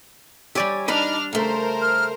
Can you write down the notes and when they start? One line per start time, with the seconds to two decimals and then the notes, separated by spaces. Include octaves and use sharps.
0.55 G3 G4 C#5 D5 E5 G#5
0.88 D4 D#4 B4 D#5 B5 F6
1.33 C#3 A3 A#4 C5
1.81 F6